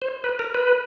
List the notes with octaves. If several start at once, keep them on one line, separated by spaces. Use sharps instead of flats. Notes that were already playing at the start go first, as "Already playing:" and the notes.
C5
B4
A#4
B4